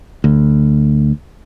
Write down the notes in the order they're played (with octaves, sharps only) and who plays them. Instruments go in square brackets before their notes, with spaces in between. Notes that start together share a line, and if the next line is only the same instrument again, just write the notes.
[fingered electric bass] D2